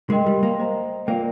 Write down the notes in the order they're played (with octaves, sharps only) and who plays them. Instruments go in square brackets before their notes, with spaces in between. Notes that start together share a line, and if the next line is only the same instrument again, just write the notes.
[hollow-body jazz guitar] G#3 [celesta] A#4 D#5 G5 C6
[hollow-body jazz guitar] G3
A#3
[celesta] C5 D#5 A#5
[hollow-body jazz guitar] A#3 [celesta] F4 A#4 D5 G5